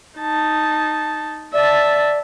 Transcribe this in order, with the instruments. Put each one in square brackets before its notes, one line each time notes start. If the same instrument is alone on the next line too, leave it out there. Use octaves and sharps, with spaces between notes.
[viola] D#4 A5
[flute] D5 [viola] E5 A5